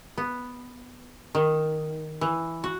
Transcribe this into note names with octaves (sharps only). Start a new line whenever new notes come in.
B3
D#3
E3
F#4